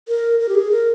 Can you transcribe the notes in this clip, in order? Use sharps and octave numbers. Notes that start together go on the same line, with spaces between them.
A#4
A#4
G4
G#4
A#4